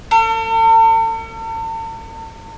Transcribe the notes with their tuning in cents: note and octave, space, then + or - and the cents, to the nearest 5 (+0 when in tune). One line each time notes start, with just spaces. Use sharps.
A4 +45